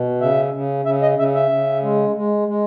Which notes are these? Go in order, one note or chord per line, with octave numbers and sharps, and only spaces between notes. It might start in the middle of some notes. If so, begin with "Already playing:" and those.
Already playing: B2
C#3 E5
C#3
C#3 E5
D#5
C#3 E5
E5
C#3
G#3
G#3
G#3